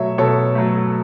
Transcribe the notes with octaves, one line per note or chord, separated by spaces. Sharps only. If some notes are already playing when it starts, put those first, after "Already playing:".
Already playing: B2 F#3 A3 C#5 E5
B2 A4 C#5
F#3 A3